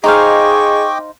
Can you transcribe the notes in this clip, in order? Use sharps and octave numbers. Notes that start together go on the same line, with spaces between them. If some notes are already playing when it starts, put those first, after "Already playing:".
D#4 G#4 C5 D#5 F5 G5 C#6 D6